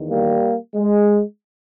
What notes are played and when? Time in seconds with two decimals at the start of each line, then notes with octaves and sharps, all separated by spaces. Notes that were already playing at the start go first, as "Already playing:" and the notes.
Already playing: E2 D#3
0.09 G3 A#3
0.75 G#3